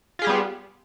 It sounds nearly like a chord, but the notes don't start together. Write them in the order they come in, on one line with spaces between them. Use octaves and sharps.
F4 G#4 G4 G3 B3